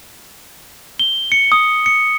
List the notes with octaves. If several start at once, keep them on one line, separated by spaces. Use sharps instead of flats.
G7
C#7
D#6
C#7